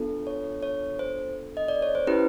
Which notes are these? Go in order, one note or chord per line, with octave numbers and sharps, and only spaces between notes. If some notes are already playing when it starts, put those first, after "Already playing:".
Already playing: B3 D4 F4 A4
C#5
C#5
C5
D#5
D5
C#5
C5
C#4 E4 G4 B4